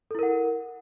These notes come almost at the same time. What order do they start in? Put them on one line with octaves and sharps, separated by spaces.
A4 E4 A#4 F#5